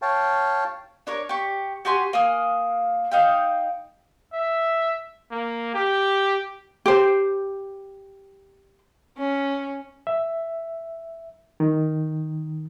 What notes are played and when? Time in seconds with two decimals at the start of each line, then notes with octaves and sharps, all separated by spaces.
0.02 C#5 F5 G5 A5
1.07 D4 A#4 C#5
1.29 G4 C#6
1.85 F#4 G4 G#5 C6
2.13 A#3 G#5 D#6 F6
3.11 D#4 F5 G5
4.33 E5
5.31 A#3
5.74 G4
6.86 G4 C5
9.18 C#4
10.07 E5
11.60 D#3